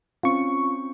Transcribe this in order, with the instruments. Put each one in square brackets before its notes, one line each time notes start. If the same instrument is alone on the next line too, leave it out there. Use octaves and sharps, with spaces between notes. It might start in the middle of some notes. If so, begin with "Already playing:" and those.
[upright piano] C4 C#4 [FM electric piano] F4 C#6